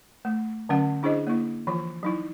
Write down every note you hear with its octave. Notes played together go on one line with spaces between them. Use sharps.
A3
D3 F#3 C#4 F#5
D4 E4 G#4 C5 D#5
A#3 E4
E3 F3 F4
F#3 D#4 E4